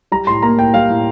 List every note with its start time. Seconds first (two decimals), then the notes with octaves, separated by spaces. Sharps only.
0.12 G3 A#5
0.27 A2 C6
0.43 A#3 A#5
0.58 A2 G5
0.74 G3 F5
0.89 A2